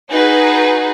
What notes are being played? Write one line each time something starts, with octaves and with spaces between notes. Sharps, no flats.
D#4 F#4 G#4 B4